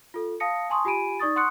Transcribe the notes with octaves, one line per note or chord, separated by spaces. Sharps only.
F4 A4
F5 A5 D#6 A#6 C#7
G#5 A5 C6 C#6 D#6
F4 G4 G#5 B5 D7 D#7
D#4 D5 C#6 D#6 A6
F#5 C6 C#6 D#6 F#6 C#7